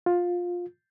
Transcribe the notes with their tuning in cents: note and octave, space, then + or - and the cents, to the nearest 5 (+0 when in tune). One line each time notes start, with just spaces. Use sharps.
F4 +15